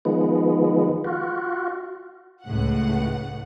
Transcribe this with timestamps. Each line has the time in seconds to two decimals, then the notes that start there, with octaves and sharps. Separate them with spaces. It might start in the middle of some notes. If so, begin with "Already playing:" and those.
0.05 D#3 F3 G#3 B3
1.04 F4 F#4
2.44 C#2 A2 F#5